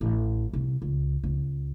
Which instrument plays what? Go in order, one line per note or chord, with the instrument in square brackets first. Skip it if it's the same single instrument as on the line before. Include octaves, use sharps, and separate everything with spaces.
[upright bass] A1
C2
C#2
C#2